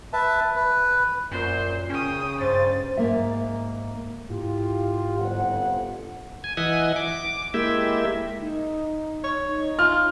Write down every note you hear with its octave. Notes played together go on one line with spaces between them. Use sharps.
B4 E5 A5
B4
F#2 A#2 C5
C#3 C#4 G5 D#6
G2 C5 A6
G#2 B2 A#3 E5
G#2 E4 F4 G4
G1 F2 F#5
G#5
E3 D#5 E5 F#5 G#5
D6
G#3 A#3 E4 G4 E5
D#4
C#5
D#4
F4 F6